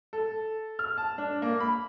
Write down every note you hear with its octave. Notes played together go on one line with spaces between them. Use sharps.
A4
F6
A5
D4
A#3
B5